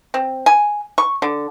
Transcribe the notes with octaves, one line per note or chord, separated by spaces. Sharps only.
C4
G#5
C#6
D3